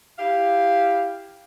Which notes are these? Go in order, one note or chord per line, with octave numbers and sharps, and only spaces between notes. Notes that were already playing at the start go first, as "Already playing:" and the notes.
E4 G4 F5